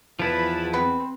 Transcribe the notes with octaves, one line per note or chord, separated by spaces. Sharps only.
E2 F3 E4 B4 A5
B3 C4 B4